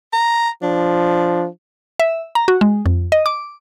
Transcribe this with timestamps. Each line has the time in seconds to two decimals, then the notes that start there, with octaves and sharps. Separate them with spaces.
0.13 A#5
0.63 F3 D4
1.99 E5
2.35 A#5
2.48 F#4
2.61 G#3
2.86 F2
3.12 D#5
3.26 D6